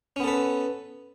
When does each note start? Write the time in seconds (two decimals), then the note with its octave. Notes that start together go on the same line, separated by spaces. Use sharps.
0.16 C#4
0.20 B3
0.24 A4
0.28 B4